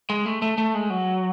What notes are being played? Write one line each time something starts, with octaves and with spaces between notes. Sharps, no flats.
G#3
A3
A3
A3
G#3
F#3